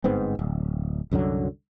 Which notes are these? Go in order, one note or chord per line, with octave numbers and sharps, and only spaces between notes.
G1 G#2 B3 C4
D1
C2 F#2 D3 F#3